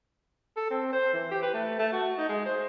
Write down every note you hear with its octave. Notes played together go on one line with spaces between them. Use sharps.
A4
C4
C5
E3
G4
B4
A3
A3
F#4
D#4
G#3
C5